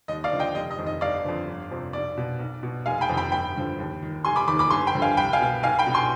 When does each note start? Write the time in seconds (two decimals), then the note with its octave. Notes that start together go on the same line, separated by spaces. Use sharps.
0.08 D#2 D#5
0.24 D5 F5
0.32 D3 F3
0.39 D#5 G5
0.55 F1 D#5
0.71 D#5
0.78 F2 D#3
0.86 D#5
1.01 G1 D5 F5
1.25 F2 D3 F3
1.47 G1
1.71 F2 C3 F3
1.93 B1 D5
2.17 B2
2.39 B1
2.63 B2
2.86 F1 F5 G#5
2.98 G#5
3.01 G5 B5
3.09 F2 C3 D#3
3.17 G5 B5
3.32 G1 G5 B5
3.56 G2 D3 F3
3.79 D#2
4.02 D#3
4.25 F1 G#5 C6
4.36 B5 D6
4.47 D#2 D#3 B5 D6
4.59 B5 D6
4.71 G1 G#5 C6
4.87 G5 B5
4.95 G2 D3 F3
5.02 F5 G#5
5.17 C2 G5 B5
5.33 F5 G#5
5.40 B2
5.63 B1 F5 G#5
5.79 G5 B5
5.87 B2
5.94 G#5 C6